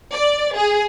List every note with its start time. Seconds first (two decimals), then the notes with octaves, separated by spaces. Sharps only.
0.12 D5
0.54 G#4